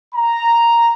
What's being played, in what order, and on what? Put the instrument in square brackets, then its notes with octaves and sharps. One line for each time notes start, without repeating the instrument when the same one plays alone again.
[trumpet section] A#5